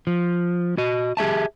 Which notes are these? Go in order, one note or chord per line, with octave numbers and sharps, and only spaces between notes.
F3
F#4 D#5
G4 G#4 E5 A5